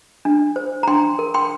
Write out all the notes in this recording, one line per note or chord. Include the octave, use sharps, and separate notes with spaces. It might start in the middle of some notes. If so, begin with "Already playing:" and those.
D4
C5
A#5
D4 G5 C6
A#4
G5 C6